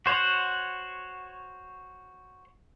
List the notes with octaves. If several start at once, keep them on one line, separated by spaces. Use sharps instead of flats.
F#4 C5 C#5 F#5